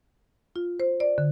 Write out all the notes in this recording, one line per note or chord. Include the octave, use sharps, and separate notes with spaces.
F4
C5
D5
D3